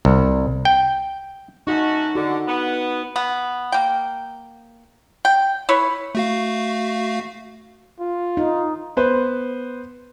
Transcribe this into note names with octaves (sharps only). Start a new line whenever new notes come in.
C2
G5
A3 C#4 D#4 F#4
D3 F#4
B3
B3
A#3 G5
G5
E4 B4 C#5
A3 F#4 F5
F4
D#4
B3 B4 C5